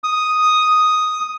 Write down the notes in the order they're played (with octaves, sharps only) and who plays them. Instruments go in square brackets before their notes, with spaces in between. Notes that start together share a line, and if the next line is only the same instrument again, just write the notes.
[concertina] D#6